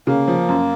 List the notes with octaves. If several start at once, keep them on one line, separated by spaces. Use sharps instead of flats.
C#3 A#3
F3
F#2